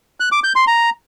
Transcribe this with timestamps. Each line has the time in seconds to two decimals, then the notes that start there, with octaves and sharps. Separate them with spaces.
0.20 F#6
0.32 D6
0.44 G6
0.56 C6
0.67 A#5